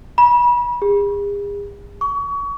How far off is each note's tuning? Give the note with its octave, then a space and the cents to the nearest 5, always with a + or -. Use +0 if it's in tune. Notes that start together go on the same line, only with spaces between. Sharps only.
B5 -35
G#4 -45
C#6 +30